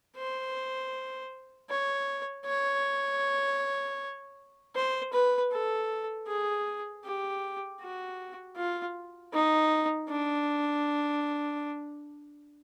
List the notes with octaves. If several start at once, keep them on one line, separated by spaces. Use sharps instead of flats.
C5
C#5
C#5
C5
B4
A4
G#4
G4
F#4
F4
D#4
D4